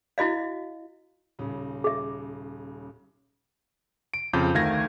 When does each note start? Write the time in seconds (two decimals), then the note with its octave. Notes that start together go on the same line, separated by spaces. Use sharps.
0.18 E4 F#4 D#5 F5
1.39 D#1 C#3
1.84 G#4 E5
4.14 D7
4.33 F2 C#3 F4 D6 G6
4.54 D2 D#3 A3 F5 G#6 A#6